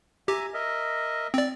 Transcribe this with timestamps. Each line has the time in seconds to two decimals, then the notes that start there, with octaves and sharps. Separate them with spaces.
0.28 G4 E5 G#5 A#5
0.54 A#4 D#5 E5
1.34 C4 D5